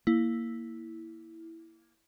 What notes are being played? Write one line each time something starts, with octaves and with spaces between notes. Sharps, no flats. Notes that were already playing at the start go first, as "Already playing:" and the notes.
A#3 E4